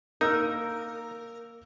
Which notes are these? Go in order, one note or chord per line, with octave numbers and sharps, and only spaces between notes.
A#3 D#4 A#4 E6 F6